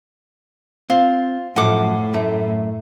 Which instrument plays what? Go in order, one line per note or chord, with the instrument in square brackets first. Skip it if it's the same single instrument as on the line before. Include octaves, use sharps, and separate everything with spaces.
[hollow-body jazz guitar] C4 [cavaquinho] F4
[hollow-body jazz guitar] F#2 F3 A4 [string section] A2 [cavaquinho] F#5 D6
[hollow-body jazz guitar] F#2 A3